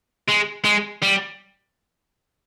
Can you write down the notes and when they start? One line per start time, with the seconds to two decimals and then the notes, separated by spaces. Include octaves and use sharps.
0.28 G#3
0.64 G#3
1.03 G3